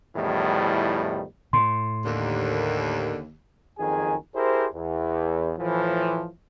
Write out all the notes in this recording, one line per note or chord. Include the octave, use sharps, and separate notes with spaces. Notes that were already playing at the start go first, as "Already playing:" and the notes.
E2 A2 D#3 F3 G3
A2 C6
D#2 D3
F#1 F2 D#3 G#4 G#5
E4 G4 G#4 A#4 C5
E2
A2 E3 F3